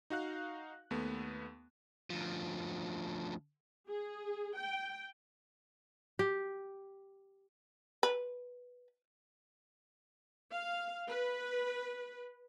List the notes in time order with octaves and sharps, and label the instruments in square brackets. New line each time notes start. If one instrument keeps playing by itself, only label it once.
[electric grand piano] D#4 F#4 F5 F#6
D#2 A3 B3
[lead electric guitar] D2 F3
[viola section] G#4
G5
[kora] G4
[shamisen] B4
[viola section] F5
B4